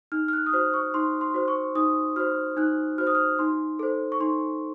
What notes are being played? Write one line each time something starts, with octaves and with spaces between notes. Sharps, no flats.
D#4 F6
F6
F#6
D#6
F#4 C5 F6
C#6
D#4 C6
C6
F#4 C5
C#6
D#4 D#6
F#4 C5 F6
D#4 F#6
F#4 C5 F6
D#6
F6
D#4 C6
A4 C5
C#6
D#4 C6